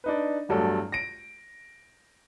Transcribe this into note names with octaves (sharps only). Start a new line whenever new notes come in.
D4 D#4 B4
A1 E2 G2 F#3 D4 A4
A#6 D7